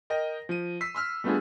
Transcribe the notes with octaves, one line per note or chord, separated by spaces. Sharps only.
A#4 D#5 G5 A#6
F3 D#7
E6 B6 C7
C6 E6 F6
G3 A3 B3 D4 F4 G#4